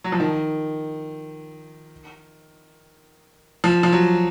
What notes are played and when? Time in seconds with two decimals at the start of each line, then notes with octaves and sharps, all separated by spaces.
0.04 F#3
0.12 F3
0.20 D#3
3.64 F3
3.83 F3
3.92 F#3